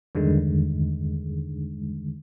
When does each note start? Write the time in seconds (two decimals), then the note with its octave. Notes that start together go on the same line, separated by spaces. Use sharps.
0.15 E2 G2 D3 D#3 G#3